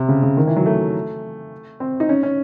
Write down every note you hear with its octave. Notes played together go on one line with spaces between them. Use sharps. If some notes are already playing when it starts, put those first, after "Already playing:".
Already playing: C3
C#3
C#3
D#3
E3
F#3
A3
C4
D#4
C#4
C#4